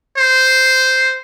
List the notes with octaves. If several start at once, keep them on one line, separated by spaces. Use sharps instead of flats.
C5